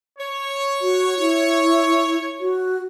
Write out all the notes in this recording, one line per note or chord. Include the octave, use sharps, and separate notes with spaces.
C#5
F#4
E4
F#4